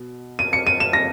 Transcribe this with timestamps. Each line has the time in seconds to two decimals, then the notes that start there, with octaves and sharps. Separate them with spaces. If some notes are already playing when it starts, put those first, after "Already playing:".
Already playing: B2
0.39 D#7
0.53 C#7
0.67 D#7
0.80 E7
0.93 A#6